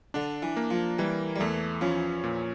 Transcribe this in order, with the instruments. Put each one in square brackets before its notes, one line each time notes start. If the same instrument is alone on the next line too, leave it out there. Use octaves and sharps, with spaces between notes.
[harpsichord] D3 [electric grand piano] D4
[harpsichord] E3
[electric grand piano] A#3
[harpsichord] F3
[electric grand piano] E3 [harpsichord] G3
[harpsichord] G3
[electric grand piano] E2 [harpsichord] A3
[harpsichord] F3 [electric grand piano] C#4
[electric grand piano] A#2